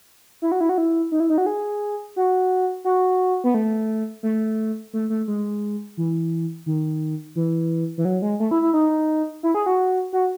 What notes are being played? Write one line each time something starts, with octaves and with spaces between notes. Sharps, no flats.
E4
F#4
E4
F#4
E4
D#4
E4
D#4
F#4
G#4
F#4
F#4
B3
A3
A3
A3
A3
G#3
E3
D#3
E3
E3
F#3
G#3
A3
E4
E4
D#4
E4
G#4
F#4
F#4